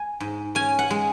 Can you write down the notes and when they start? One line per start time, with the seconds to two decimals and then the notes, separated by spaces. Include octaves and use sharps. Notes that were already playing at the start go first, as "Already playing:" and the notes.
Already playing: G#5
0.20 G#2
0.55 C#4 G#5
0.79 F#5
0.90 G#3